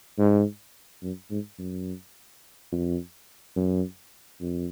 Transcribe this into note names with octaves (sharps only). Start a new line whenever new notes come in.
G#2
F#2
G#2
F#2
F2
F#2
F2